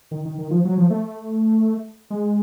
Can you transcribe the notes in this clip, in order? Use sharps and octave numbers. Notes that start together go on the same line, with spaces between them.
D#3
D#3
D#3
F3
F#3
F3
A3
G#3